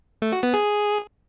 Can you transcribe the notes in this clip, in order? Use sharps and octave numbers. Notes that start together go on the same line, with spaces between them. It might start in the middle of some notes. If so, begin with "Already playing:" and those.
A3
F#4
B3
G#4